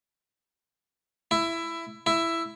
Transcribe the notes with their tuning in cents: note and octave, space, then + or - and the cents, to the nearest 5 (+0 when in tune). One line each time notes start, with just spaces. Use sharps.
E4 +15
E4 +10